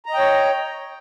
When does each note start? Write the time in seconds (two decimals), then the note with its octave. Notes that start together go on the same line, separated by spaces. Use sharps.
0.06 A#5
0.10 D#5
0.14 G5
0.18 C#5